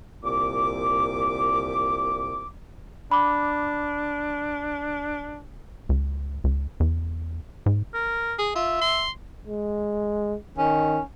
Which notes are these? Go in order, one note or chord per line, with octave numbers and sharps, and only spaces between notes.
C2 A#2 D6
D4 B5 D6
C#2
C#2
E2
G#2
A#4
G#4
F4 E5
C6
G#3
D#3 C#4